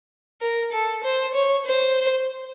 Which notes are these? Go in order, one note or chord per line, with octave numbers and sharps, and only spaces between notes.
A#4
A4
C5
C#5
C5